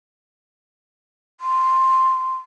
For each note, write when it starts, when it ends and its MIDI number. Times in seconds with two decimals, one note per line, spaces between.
1.41 2.36 84